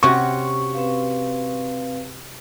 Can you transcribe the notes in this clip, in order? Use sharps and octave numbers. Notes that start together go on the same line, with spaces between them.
C3 C#4 F#4 C6 C#6
C4 B4 F5